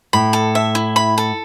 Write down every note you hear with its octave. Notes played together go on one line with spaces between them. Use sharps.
A2 B5
A4
E5
E4
B5
A4